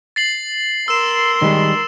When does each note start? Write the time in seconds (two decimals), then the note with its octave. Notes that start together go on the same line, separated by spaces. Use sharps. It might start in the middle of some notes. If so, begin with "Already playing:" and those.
0.16 A6 C7 F#7
0.88 A#4 C6 E6 E7
1.42 D#3 G3 G#3